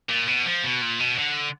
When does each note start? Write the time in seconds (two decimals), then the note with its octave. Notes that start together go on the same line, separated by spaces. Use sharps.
0.09 A#2
0.27 B2
0.46 F3
0.64 B2
0.82 A#2
1.00 B2
1.18 D3